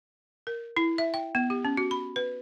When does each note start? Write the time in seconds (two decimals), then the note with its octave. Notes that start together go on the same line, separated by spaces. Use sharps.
0.47 A#4
0.77 E4
0.98 E5
1.14 G5
1.35 B3
1.50 G4
1.65 C#4
1.77 F#4
1.91 B5
2.16 B4